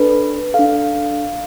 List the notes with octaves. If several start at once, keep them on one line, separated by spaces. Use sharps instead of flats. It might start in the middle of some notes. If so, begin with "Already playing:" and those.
Already playing: D4 A4 B4
A4 F5
D4